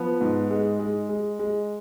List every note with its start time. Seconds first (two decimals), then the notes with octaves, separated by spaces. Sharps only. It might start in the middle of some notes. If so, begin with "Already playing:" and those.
Already playing: F3 B3
0.21 G#2
0.50 G#3
0.79 G#3
1.09 G#3
1.39 G#3